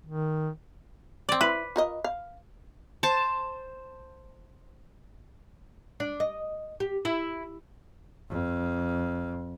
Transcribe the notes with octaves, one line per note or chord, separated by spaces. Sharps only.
D#3
C4 D5
E4 B4
F4 A#4 D#5
F5
C5 A5
D4
D#5
G4
E4
F2